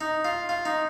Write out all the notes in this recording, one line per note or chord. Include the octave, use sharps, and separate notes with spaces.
D#4
F4
F4
D#4